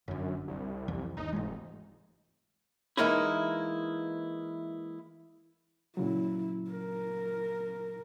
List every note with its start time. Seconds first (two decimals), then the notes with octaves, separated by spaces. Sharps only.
0.08 G1 F#2 D3
0.48 C2
0.88 F2 E3
1.17 G1 D#2 D#4
1.33 F1 G#2 E3 G#3
2.97 E3 G#3 A#3 D#4 E4
5.97 A#2 C#3 F#3 E4
6.71 A#4